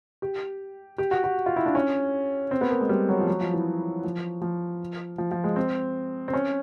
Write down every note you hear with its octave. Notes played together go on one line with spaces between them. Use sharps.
G4
G4
F#4
F#4
F4
E4
D4
C#4
C4
B3
A#3
G#3
G3
F#3
F3
F#3
F3
E3
F3
F3
F3
F3
G#3
C4
C4
C#4